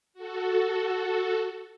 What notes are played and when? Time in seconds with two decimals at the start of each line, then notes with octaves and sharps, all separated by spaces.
0.14 F#4 A4